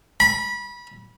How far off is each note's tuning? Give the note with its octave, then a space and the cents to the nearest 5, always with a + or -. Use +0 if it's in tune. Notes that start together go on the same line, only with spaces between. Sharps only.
B5 -25